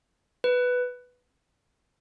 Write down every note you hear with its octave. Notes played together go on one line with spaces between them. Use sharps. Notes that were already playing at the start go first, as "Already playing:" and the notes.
B4